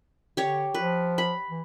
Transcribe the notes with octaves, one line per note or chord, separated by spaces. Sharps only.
D3 G4 C#5
F3 B4
B5
E3